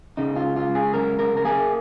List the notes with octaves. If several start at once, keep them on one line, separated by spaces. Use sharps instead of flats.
C#3 D#4
F4
C#2
F4
C#2
G#4
C#3 A#4
C#3 A#4
A#4
A#3 G#4